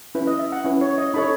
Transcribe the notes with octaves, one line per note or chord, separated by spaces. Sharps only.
C#4 E4 B4
D#5
E5
F#5
C#4 E4 B4
C#5
D#5
D#4 A4 C#5 B5